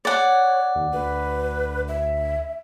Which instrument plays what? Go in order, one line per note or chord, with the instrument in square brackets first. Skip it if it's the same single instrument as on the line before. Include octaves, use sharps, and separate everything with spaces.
[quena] C#5 [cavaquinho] D5 F#5
[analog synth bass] D#2
[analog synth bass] D2 [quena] B4
[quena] E5